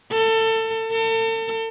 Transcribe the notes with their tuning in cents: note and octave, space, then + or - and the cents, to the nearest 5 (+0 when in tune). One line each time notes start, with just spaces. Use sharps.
A4 +25
A4 +40